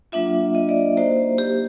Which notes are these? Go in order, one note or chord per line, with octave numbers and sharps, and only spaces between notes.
F#3 A#3 D4 F4 E5
D#5
D5
A#3 D#4 F#4 C5
G4